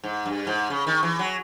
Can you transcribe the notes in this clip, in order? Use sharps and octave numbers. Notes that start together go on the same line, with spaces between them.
G#2
G2
G#2
C#3
D#3
E3
F#3